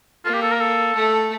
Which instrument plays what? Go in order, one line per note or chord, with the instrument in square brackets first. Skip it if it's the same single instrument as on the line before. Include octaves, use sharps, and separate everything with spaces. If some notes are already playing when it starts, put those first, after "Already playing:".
[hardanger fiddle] A#3 [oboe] F4
[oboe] G4
A4
A#4
A4
[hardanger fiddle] A3